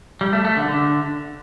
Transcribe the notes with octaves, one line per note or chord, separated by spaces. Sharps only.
G3
A3
A3
D3
D3